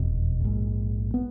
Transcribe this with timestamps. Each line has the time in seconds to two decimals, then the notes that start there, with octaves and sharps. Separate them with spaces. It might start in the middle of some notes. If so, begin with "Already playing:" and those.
Already playing: F1 E2 B2
0.40 A#1 G#2
1.14 B3